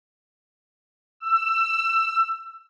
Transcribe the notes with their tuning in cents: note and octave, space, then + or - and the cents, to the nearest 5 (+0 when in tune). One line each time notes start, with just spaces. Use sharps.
E6 +20